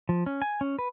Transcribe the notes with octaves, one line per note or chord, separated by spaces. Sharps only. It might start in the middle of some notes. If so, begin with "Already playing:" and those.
F3
C#4
G#5
C#4
B4